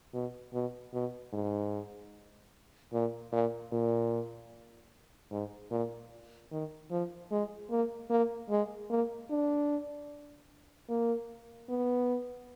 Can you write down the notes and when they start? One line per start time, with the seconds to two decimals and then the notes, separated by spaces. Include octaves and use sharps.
0.13 B2
0.53 B2
0.93 B2
1.33 G#2
2.93 A#2
3.32 A#2
3.72 A#2
5.31 G#2
5.71 A#2
6.51 D#3
6.90 F3
7.31 G#3
7.70 A#3
8.10 A#3
8.50 G#3
8.90 A#3
9.30 D4
10.89 A#3
11.69 B3